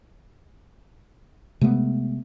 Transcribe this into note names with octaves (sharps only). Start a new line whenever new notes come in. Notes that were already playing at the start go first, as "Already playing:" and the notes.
C3 G#3 A3 B3